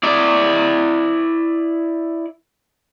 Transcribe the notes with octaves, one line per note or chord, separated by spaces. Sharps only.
E4 D5